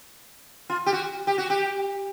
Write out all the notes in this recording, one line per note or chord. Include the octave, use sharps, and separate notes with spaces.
F4
G4
F#4
G4
F#4
G4